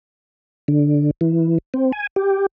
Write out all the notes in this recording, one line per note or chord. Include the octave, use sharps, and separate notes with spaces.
D3
E3
C4
G#5
G4